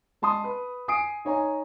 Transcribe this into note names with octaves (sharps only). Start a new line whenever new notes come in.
G#3 A5 C6 D#6
B4
G#5 D#6 C7 D7
D#4 C#5 G#5 A#5